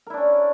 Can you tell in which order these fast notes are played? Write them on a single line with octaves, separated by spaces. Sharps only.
A#4 E4 D4 C#4